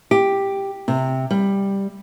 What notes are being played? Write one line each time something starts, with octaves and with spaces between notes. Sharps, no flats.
G4
C3
G3